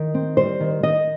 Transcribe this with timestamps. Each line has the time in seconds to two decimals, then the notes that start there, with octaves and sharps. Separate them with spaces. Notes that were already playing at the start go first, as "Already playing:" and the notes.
Already playing: D#3
0.14 C4
0.37 G3 C5
0.60 D#3
0.83 D#3 D#5